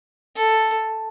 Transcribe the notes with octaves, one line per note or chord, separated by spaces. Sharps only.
A4